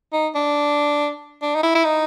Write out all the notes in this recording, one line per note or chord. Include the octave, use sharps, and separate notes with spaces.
D#4
D4
D4
D#4
E4
E4
D#4